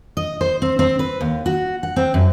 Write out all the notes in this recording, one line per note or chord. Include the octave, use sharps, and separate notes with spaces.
D#5
C5
C4
C4
B4
D#2
F#4
F#5
C4
F#2